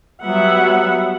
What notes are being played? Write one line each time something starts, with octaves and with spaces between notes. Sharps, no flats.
F#3 G3 B3 E5 F#5